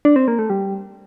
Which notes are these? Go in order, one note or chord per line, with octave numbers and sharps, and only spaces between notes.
D4
C4
A#3
A3
G3